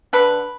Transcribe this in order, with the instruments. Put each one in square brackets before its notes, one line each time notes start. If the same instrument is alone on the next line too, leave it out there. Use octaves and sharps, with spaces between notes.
[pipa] D3 B4